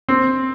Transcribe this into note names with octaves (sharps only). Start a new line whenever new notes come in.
C4